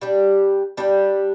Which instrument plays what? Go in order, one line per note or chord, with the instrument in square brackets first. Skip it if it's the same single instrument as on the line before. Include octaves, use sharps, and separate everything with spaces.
[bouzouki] G3 D4 G4
G3 D4 G4